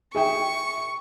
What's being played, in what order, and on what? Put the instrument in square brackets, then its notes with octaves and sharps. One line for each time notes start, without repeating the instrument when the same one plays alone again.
[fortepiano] G#4 E5 G5 [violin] C#6